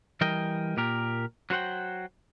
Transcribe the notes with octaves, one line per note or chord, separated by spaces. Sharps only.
E3 G3 A#4 D#5 G5
A#2 G4 A#4
F#3 F#4 C5 F#5 G5